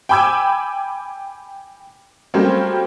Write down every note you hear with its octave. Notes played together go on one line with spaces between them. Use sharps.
G5 G#5 B5 D6 E6 G#6
F#3 G3 A3 A#3 C4 C#4